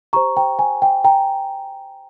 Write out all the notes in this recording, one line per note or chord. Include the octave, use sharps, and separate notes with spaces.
G4 C5 A#5 C#6
G5 A#5
G#5
G5
G5 A#5